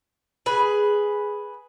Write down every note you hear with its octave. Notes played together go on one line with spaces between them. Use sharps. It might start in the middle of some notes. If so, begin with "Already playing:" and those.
G#4 B4